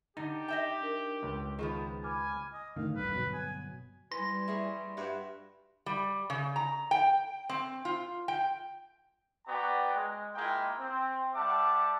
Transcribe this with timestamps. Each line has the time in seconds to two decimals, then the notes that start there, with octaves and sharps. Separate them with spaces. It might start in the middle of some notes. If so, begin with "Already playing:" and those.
0.17 D3 D#4 G4 A6
0.48 D#5 E5 G5 G6
0.81 D4 A#4
1.23 C#2
1.59 D#3 F3 B3 F4 G#4
2.04 G#5 B5 D6 F6
2.53 D#5
2.76 A2 D3 D#3 F5
2.95 A#1 E2 G2 B4
3.14 G1 B2 F#3
3.34 G#5
4.12 E3 G3 C6 A#6
4.48 E4 G#4 C#5
4.97 G2 F#4 E5 B5
5.86 G3
6.30 C#3
6.56 A#5
6.91 G5
7.49 C4
7.85 F4
8.28 G5
9.46 B3 F#4 D5 G5 A#5
9.94 G#3
10.34 G#3 A#3 E4 F4 G5
10.78 C4
11.34 G3 E5 F#5 A5 D6